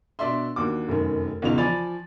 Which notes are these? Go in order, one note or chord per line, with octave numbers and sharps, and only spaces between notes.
B2 D4 D5 E5 C6
D#2 D4 F#4 D6
F1 F#2 D#3
B1 E2 C#3 D#4 F4 F7
F3 D5 G#5 B5 A6 F7